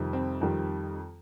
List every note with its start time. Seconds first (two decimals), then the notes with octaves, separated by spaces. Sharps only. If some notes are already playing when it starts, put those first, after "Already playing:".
Already playing: F2 C3 D#3 G3
0.13 C4
0.41 F2 D#3 G3